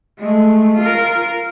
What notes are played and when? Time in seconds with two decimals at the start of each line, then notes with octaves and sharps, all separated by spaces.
0.19 G#3 A3
0.78 F4 A#4